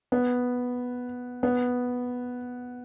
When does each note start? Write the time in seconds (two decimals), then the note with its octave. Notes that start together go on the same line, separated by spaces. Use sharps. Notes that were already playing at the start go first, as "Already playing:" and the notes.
0.12 B3
1.43 B3